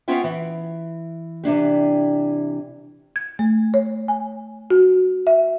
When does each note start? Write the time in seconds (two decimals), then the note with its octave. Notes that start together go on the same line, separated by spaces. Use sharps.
0.08 B3 C#4 F4 C5 E5 G5
0.24 E3
1.44 C3 E3 D4 G4
3.16 G#6
3.39 A3
3.74 C#5
4.08 G#5
4.70 F#4
5.27 E5